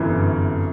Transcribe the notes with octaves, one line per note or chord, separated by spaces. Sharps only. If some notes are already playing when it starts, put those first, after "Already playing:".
Already playing: G1 F#2 C3 E3